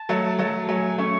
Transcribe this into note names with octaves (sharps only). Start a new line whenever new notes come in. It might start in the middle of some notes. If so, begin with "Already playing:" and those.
Already playing: A5
F#3 A3
F#3 A3
A5
F#3 A3 G#5
A3 C#4 C#6